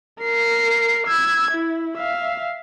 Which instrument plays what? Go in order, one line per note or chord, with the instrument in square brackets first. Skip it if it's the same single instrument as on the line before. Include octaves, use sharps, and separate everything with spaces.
[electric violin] A#4 C7
E6 G#6
E4
E5 F5